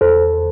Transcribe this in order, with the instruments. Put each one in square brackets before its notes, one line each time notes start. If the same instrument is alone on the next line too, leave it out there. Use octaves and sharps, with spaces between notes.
[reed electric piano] E2 A4 C5